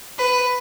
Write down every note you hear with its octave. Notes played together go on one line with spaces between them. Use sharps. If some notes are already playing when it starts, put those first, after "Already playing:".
B4